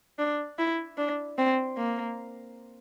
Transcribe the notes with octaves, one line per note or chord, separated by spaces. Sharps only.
D4
E4
D4
C4
A#3